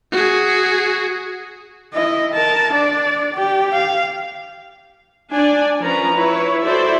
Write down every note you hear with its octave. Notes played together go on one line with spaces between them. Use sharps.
F#4 G#4
E4 D#5
A#4 A5
D4 D5
G4
F5
D4 D5 G#5
F3 C#4 A#4 B4 A#5
E4 B4 C#5
E4 F#4 A4 C5 D5 E5